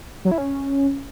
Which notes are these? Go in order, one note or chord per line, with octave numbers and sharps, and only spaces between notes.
F#3
E4
C#4